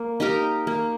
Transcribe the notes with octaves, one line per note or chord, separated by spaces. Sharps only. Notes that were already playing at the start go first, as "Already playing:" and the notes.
Already playing: A#3
D#4 G4 A#4
A#3